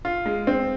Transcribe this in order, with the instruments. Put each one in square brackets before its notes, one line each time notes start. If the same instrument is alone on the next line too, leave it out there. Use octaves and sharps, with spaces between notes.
[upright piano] F4
G#3
C4